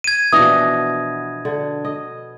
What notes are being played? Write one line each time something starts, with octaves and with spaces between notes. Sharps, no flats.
G#6 D#7
B2 E3 F3 B3 D4 D#6 A#6
D3
D#5